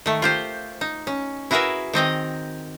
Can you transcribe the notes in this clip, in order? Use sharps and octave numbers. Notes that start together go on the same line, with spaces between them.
D#3 A3
F4 G4 C5
D#4
C#4
E4 F#4 G#4 A#4 B4 E5
D#3 C4 D#5 A#5